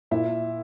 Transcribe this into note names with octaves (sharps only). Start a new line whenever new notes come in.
A#2 E4